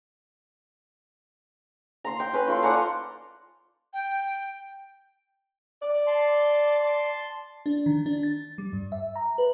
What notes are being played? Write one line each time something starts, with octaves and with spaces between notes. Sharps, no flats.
A#5 C6
G5
C#4 B4
F4 A4 C6
D5 F#5 G#5 A#5
G5
D5
A5 C6
D4
D#3
D4
A6
G3
G2
E5
A#5
B4